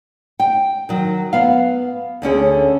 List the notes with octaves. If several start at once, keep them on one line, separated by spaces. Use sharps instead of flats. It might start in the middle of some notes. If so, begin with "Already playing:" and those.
G5
D#3 F#3
B3 F5
D2 D3 C#4 G#4